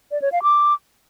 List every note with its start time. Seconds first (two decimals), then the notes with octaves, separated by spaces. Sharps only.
0.11 D5
0.22 C#5
0.32 F5
0.43 D6